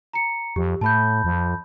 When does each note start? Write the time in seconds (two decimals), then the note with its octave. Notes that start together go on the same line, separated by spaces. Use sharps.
0.13 A#5 C#7
0.56 F2 G4
0.81 A2 A5 B5 G6
1.24 F2